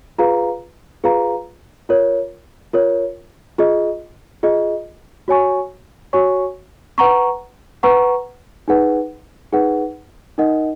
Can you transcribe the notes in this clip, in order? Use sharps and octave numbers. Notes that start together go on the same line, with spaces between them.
F4 G#4 B4 F5 A#5
F4 G#4 B4 F5 A#5
F4 A#4 C#5
F4 A#4 C#5
F4 G#4 D#5
F4 G#4 D#5
F#4 C#5 G#5 C#6
F#4 C#5 G#5 C#6
B4 F#5 A#5 C#6
B4 F#5 A#5 C#6
D#4 G#4 B4 F#5
D#4 G#4 B4 F#5
D#4 A#4 D#5 F#5